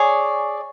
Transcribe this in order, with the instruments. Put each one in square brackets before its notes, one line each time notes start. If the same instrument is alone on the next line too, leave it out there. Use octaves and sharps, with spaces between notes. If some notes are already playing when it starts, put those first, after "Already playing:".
Already playing: [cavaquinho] G#4 C#5 D5 C#6